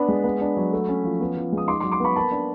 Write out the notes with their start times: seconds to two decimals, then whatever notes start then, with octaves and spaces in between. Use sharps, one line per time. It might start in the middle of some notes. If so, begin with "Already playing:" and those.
Already playing: B3 D4 B5
0.08 G#3
0.24 B3
0.41 D4
0.57 F#3
0.73 A3
0.89 C#4
1.04 F3
1.21 B3
1.37 F3
1.52 G#3
1.58 D#6
1.68 D#4 C6 D6
1.80 C6 D6
1.84 F#3
1.92 C6 D6
2.00 B3 B5 C#6
2.16 A#3 A5 B5
2.31 D4